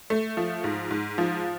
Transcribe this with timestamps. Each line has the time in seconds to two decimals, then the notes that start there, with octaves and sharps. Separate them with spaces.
0.10 A3
0.37 F3
0.64 G#2
0.91 G#2
1.18 F3